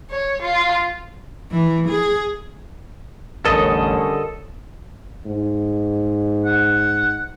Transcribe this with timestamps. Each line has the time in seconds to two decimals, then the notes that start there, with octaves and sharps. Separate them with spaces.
0.10 C#5
0.42 F4
1.52 E3
1.89 G#4
3.45 A1 E2 D3 G3 C#4 A4 A#4 D#5
5.26 G#2
6.45 F#5